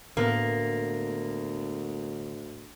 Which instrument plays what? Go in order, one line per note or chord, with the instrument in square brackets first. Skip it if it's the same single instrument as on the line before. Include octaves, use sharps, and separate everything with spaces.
[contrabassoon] D2 [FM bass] A2 [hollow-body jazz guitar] D3 B3 [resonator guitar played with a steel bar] A#3